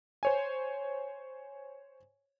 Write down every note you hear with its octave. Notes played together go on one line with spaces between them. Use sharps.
C5 C#5 G#5